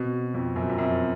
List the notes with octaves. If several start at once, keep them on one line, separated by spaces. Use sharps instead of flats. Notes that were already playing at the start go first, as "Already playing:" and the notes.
Already playing: B2 C4
F2
F#2
F2
F#2